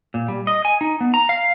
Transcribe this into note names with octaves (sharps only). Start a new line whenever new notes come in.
A#2
G3
D#5
G#5
D#4
B3
A#5
F5